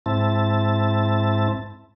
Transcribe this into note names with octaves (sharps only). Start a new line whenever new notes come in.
G#2 C4 E4 A5